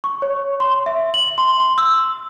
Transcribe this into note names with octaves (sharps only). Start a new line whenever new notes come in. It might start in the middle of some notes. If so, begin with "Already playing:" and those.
C#6
C#5
C6
E5
F#7
C6
C6
E6